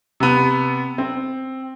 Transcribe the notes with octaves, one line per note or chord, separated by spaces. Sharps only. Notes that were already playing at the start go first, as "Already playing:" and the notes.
C3 B3
C4